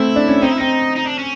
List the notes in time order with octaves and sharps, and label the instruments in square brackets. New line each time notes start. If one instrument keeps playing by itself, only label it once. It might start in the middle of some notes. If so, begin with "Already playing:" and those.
Already playing: [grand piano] A3 C4 [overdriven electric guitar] E4
[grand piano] D4
C#4
[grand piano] C4 [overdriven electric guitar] D#4
[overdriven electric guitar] E4
[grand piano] C4 [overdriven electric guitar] D#4
[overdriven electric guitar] D#4
D4
C#4